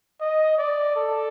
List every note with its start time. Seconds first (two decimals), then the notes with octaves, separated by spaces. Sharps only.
0.21 D#5
0.58 D5
0.96 A4